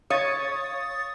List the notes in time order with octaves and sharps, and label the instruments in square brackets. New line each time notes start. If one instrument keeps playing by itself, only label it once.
[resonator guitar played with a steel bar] C#5 [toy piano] F5 C#6 [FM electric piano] D#6 A6